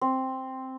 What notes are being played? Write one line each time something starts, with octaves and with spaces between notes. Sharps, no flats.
C4